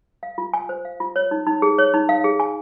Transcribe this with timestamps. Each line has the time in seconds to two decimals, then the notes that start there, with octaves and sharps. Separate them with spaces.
0.23 F5
0.38 F4
0.54 G#5
0.69 C5
0.85 F5
1.00 F4
1.16 C#5
1.31 D#4
1.47 D#4
1.62 G#4
1.78 C#5
1.94 D#4
2.09 F5
2.24 G#4
2.40 G#5